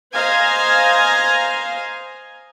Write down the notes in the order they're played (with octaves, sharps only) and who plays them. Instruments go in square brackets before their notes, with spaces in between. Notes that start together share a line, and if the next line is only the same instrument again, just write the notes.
[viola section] C5 D#5 F5 G#5 A#5